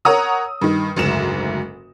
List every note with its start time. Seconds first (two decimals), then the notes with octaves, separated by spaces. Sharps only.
0.05 A#4 C#5 F#5 A#5 D#6 E6
0.61 G2 D#3
0.96 F#1 D2 G#2 E7